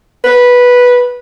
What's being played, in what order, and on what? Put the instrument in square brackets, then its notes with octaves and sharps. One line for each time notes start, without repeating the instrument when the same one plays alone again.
[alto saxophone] B4